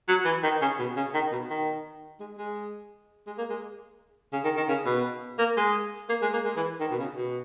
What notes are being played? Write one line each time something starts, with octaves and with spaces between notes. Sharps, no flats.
F#3
E3
D#3
C#3
B2
C#3
D#3
B2
D#3
G#3
G#3
G#3
A#3
G#3
C#3
D#3
D#3
C#3
B2
A#3
G#3
A#3
G#3
A#3
G#3
E3
D#3
B2
C#3
B2